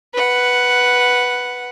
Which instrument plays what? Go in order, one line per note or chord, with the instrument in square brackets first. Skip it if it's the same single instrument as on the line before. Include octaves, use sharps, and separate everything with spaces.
[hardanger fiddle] B4 F#5